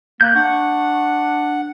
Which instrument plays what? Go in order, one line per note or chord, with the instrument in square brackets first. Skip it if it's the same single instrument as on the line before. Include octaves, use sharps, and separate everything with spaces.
[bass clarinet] A#3 [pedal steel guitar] F#6 G6
[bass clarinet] D4 [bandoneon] F#5 [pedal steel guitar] C#6